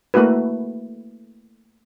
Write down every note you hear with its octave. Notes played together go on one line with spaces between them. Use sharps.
A3 A#3 E4 F#4 B4